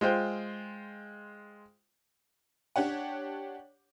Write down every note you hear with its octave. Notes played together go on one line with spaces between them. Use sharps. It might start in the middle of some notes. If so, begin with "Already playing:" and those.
G#3 F4 C5 G5
D4 G4 C#5 F#5